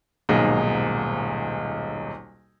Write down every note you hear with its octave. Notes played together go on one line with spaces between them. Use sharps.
D#1 B1 G#2 A#3 G#4 D#5